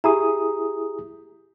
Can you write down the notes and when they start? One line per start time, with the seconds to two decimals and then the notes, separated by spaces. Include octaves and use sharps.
0.04 E4 G4 G#4 A#5 D#6